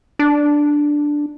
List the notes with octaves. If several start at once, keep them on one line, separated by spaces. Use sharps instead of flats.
D4